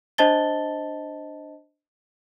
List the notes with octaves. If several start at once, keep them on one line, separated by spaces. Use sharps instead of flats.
D4 C5 D#5 A5 A6 G7